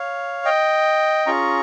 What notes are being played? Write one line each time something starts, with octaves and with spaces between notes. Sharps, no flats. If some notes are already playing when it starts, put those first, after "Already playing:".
Already playing: C#5 F5
D#5 G5
C#4 F4 G#4 A#5 C#6